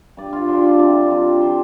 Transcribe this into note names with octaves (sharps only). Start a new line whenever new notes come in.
G2 D5
F4
D3 F3 D4 C5
D5
C3 D5
F3 C4
C5